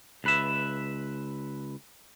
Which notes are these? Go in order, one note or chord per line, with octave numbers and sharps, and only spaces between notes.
C#2 B4 E5